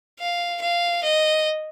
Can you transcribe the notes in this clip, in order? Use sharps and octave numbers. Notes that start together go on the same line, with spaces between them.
F5
F5
D#5